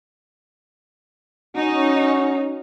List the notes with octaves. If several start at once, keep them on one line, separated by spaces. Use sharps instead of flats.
C#4 D#4 F#4